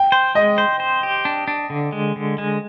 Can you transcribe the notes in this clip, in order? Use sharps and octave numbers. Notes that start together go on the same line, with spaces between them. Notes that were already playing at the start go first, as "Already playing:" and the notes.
Already playing: G5
C5
G#3 D#5
C5
C5
G4
D4
D4
D3
G#3
D3
G#3